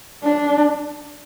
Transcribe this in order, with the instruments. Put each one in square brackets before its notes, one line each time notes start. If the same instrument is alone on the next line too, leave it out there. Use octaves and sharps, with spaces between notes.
[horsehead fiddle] D4